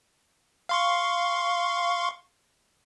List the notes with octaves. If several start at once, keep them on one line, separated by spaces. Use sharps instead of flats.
F5 C6 C#6